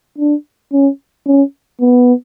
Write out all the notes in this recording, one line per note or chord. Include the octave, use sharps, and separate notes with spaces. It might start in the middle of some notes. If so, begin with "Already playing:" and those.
D4
C#4
C#4
B3